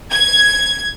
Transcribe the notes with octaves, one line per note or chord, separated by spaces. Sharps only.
G#6